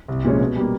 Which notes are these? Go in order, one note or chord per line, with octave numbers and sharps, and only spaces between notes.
C2
A#2 F3 G#3 C#4
B2
G3 A#3